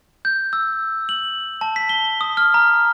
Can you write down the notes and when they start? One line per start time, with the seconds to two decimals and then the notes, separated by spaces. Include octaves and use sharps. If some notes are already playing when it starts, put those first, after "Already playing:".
0.25 G6
0.53 E6
1.09 F#7
1.61 A5
1.76 B6
1.89 G7
2.21 D#6
2.37 F6
2.54 A#5